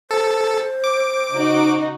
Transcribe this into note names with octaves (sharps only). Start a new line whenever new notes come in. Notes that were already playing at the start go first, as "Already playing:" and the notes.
A4 C5
D6
C#3 D#4 F#4